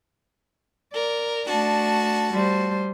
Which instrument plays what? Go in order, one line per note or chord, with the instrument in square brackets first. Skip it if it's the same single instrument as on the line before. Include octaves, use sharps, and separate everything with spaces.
[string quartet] A#4 [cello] D5
[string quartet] A3 F#4 A5 [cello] D4
[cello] G3 C5